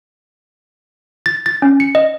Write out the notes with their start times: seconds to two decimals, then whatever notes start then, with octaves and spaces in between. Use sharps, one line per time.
1.26 A6
1.46 A6
1.62 C#4
1.80 C#7
1.95 D#5